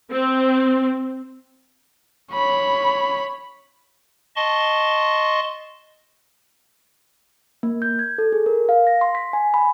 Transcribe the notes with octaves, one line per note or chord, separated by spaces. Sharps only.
C4
C#5 B5
D#5 A5 C6 C#6
A#3
G6
G#6
A4
G#4
A#4
F5
A#6
C6
B6
G#5
B5